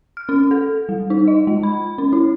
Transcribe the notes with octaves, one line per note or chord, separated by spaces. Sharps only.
F6
C#4
A4
G3
D#4
D#5
G#3
B5
C#4
E4